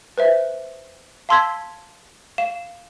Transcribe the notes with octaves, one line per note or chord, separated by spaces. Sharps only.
B4 C5 E5
F5 A5 C6 E6 G#6 B6
F5 E7